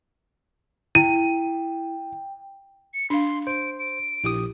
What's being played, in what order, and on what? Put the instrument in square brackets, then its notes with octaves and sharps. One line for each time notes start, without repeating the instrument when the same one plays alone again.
[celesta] E4 [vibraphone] G5 [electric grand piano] D#7
[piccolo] C#7
[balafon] D4 F5 [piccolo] C6
[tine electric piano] C5 [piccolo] D7
[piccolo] D7
[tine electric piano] A#1 G4 D#6 [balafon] E4